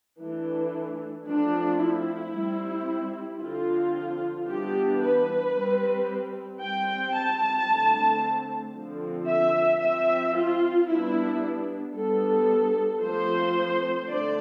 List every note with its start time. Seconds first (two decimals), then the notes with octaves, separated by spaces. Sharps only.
0.20 E3 A3 D4
1.26 F3 A3 C4 D4
1.80 E4
2.33 G3 C4
3.40 D3 F3 C4 F4
4.47 E3 G3 B3 D4 G4
5.01 B4
5.54 G3 C4
6.60 G3 C4 G5
7.15 A5
7.68 D3 A3 C4
8.74 D3 F3 C4
9.28 E5
9.81 F3 C4 E5
10.35 F4
10.88 G3 B3 D4 E4
11.95 G3 B3 D4 A4
13.02 F3 A3 C4 C5
14.08 D3 A3 D4 D5